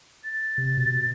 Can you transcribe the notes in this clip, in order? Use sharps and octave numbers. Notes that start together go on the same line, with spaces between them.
A6
C3
B2